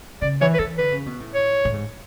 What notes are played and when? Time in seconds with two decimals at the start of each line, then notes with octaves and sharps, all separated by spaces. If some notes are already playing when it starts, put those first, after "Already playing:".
0.22 C#3 D5
0.41 E3 C#5
0.54 B4
0.59 E3 A4
0.78 D3 B4
0.92 C#3
1.06 B2
1.20 A2
1.34 C#5
1.65 A2
1.73 G#2